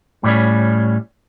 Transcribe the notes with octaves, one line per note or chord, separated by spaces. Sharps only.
A2 G3 C#4